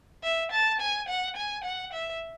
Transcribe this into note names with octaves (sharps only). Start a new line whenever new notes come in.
E5
A5
G#5
F#5
G#5
F#5
E5